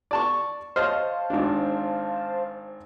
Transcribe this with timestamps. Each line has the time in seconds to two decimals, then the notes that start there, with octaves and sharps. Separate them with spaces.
0.11 D5 A5 C#6
0.76 C5 C#5 D#5 F5 A5 F6
1.30 G#1 D4